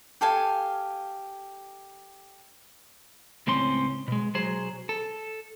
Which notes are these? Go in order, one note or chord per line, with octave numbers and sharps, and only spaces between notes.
G4 A4 F5 G#5
C#2 A2 C4 C#4 C6
B2 G#3
B1 F#3 G#4 C5
A4